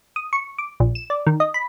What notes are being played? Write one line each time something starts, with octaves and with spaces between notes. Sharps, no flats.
D#6
C#6
D6
A#1
E7
D5
D#3
D#5
B5